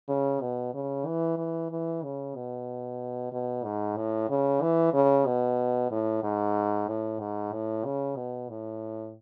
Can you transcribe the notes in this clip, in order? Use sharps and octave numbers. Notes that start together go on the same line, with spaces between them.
C#3
B2
C#3
E3
E3
E3
C#3
B2
B2
G#2
A2
C#3
E3
C#3
B2
A2
G#2
A2
G#2
A2
C#3
B2
A2